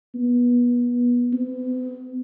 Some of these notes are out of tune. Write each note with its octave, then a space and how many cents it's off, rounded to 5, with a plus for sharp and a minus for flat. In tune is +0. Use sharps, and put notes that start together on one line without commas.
B3 -25
B3 +45